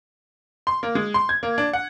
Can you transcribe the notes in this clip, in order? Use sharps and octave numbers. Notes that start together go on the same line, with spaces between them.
C6
A#3
G#3
C6
G#6
A#3
D4
F#5